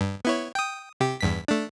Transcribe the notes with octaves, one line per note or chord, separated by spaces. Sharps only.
G2
B3 E4 C#5
G5 D#6
C3 G4
E2 G2 B6
A3 D4